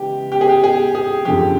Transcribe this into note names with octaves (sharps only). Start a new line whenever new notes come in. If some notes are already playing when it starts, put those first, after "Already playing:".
Already playing: C#3 E3 G#3 G4
G4
G#4
G4
G#4
G#4
F#2 D3 F3 G4